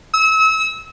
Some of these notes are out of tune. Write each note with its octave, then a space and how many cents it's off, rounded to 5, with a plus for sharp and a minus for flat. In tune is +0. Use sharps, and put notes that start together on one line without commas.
E6 -35